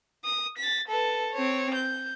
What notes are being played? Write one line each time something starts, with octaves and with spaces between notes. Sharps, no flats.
D#6
A6 B6
A4 B4
C4 C#5
G6